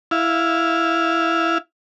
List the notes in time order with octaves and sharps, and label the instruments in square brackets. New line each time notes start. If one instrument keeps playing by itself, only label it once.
[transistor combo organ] E4 F5